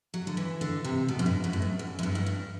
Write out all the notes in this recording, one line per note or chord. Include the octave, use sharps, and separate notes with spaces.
F#3
D3
E3
D3
C3
B2
F#2
G2
F#2
A2
G2
F#2
F#2
G2
A2
G2